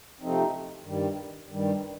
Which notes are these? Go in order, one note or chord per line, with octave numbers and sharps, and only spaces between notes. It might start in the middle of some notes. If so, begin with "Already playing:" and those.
C3 F3 A3 C4 D#4
G2 D#3 G3
G2 D#3 G3